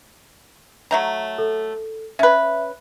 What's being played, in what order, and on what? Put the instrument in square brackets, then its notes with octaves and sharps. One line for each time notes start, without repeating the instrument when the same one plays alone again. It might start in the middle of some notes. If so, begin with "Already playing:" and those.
[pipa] F#3 A3 A#5
[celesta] A4
[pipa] C#4 B4 [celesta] E5